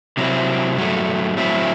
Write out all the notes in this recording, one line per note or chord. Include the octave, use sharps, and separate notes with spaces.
C3 F#3 C4 E4
G2 F#3 A3
A2 F#3 C4 E4